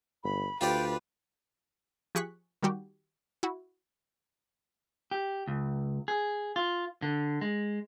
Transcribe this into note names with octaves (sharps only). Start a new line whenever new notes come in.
G1 B5
D2 F4 G4 B4 D5 G5
F3 G4 G#4 C#6 F#6 B6
D#3 G3 F#4 G4
E4 F#4
G4
C#2
G#4
F4
D3
G#3